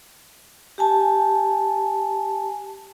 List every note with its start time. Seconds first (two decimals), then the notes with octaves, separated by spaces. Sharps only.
0.78 G4 G#5 A5